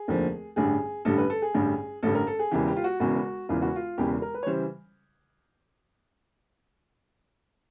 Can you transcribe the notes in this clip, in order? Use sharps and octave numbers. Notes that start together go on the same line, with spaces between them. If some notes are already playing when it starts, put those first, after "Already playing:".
Already playing: G#4
F1 D#2 D3 F3
A1 G2 D3 G3 G#4
A1 G2 D3 G3 A4
B4
A4
G#4
A1 G2 D3 G3
A1 G2 D3 G3 A4
A#4
A4
G#4
E1 E2 C#3 E3 G4
G4
F4
F#4
E1 E2 C#3 E3 F#4
E1 E2 C#3 E3 F4
F#4
F4
E1 E2 C#3 E3 G4
A#4
B4
C#5
C#3 E3 G3 C5